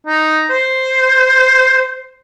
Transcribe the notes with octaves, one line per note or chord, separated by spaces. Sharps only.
D#4
C5